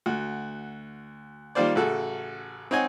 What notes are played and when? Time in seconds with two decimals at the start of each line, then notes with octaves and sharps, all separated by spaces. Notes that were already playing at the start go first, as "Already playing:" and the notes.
0.06 D2 F#4
1.55 D#3 G3 A#3 F4 C5 D5
1.75 A1 C#3 F#4 A4
2.71 C4 D#4 C#5 D#5 F#5 G#5